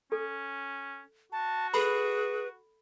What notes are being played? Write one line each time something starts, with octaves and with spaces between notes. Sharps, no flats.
C#4 A4
F#4 A5
G#4 A4 B4 B5